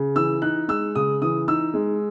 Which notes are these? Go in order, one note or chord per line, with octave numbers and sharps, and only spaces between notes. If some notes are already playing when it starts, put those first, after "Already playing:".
Already playing: C#3
E3 E6
D#4 F#6
G#3 E6
C#3 D#6
E3 D#6
D#4 E6
G#3